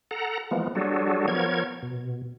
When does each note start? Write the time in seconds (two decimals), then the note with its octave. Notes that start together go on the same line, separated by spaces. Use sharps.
0.11 A4 F#5 A#5
0.51 E3 F3 G#3 A#3 B3
0.75 F#3 G3 D4 F#4 G#4 A4
1.28 F3 B3 A#4 C#5 G#6
1.83 B2